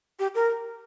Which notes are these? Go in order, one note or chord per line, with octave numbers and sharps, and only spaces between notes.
G4
A#4